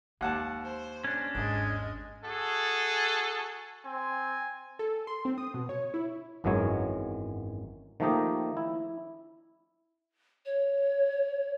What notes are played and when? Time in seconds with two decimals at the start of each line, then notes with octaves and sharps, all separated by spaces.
0.21 D#2 G#3 F#5 A5
0.65 C5
1.04 C#4 D4
1.35 G#1 E2 G#3 D#5
2.23 F#4 G#4 A4
3.85 C4 G#5
4.79 A4
5.07 C6
5.25 C4
5.38 D#6
5.54 B2
5.69 C#5
5.94 E4
6.44 G#1 F#2 E3 F#3 G#3 C#5
8.00 D#3 F3 A3 A#3 G4 D#5
8.57 E4
10.46 C#5